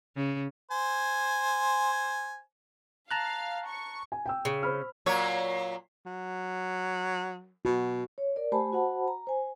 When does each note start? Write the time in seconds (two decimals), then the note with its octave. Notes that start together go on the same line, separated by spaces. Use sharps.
0.16 C#3
0.71 C5 G#5
3.11 F5 A5 A#5 F#6
3.68 C#6
4.12 G#5
4.26 G5 E6
4.45 C#3
4.63 C5 B5 F6
5.06 A#2 F#3 C#5
6.06 F#3
7.65 B2 F#4
8.18 C#5
8.36 A#4 D5
8.52 A3 G4 C5 G#5 A5 B5
8.73 F#4 C5 F#5 A5 B5
9.08 A#5
9.27 C5 G#5